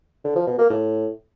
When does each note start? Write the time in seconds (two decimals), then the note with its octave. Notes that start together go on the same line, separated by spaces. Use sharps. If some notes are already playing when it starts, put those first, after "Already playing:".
0.24 D3
0.35 F3
0.47 B2
0.58 A#3
0.70 A2